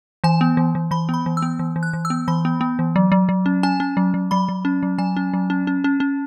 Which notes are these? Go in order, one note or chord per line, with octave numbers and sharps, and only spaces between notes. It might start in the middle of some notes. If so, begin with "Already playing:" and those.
E3 G#5
B3
E3
E3
E3 B5
B3 B5
E3
E6
B3
E3
E3
F#6
E3
E6
B3
E3 B5
B3
B3
E3
F#3
F#3
F#3
C#4
C#4 G#5
C#4
F#3
F#3
F#3 B5
F#3
C#4
F#3
F#3 G#5
C#4
F#3
C#4
C#4
C#4
C#4